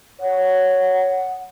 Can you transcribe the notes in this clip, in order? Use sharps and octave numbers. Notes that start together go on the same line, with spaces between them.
C#5 F#5